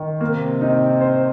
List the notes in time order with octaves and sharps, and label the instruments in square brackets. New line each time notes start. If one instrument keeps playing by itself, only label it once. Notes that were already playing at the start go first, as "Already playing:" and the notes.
Already playing: [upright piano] D#3
[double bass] C3 [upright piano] A#3
[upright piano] D#4
C5